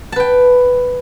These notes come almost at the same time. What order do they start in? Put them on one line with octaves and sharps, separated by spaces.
A5 B4 G5